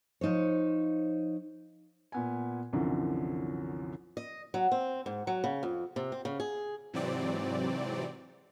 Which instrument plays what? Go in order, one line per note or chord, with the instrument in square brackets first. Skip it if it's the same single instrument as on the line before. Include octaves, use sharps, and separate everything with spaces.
[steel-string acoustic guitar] F3 D#4 C5 C#5
[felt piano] A#2 B3 G#5
C2 F#2 D3 E3 F3
[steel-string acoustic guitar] D#5
F#3
C4
G#2
F#3
C#3
F2
C3
C4
C#3
G#4
[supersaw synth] G#2 C3 E3 F#3 C4 D5